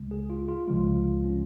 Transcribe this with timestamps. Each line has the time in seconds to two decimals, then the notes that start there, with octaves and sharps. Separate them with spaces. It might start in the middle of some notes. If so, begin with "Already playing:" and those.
Already playing: C#2 C#3 G#3
0.11 G#4
0.30 F4
0.49 F4
0.67 C#2 C#3 F3 G#3 F4
1.24 C#4